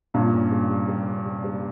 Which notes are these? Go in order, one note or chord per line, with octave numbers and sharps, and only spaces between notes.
G2 A#2 C#4
C#4
G3
C3
G3
C#4
C3
G3